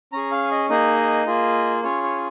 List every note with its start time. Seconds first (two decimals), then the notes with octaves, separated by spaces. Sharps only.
0.13 C#4 G#4 A#5
0.32 F5
0.51 D#5
0.70 A#3 D#4 G#4 D#5
1.27 A#3 F4 G#4
1.83 C#4 F4 G#4 C#5
2.03 C#5